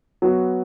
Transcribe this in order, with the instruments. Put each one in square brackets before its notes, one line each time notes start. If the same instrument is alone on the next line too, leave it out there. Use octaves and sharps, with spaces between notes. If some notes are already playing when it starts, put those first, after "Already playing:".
[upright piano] F#3 B3 F#4